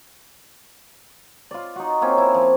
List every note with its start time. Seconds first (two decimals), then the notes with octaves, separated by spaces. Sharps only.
1.51 F4 D5
1.76 D#4 F#4
2.01 A#3 C4 C#4 F4
2.18 E4
2.34 F3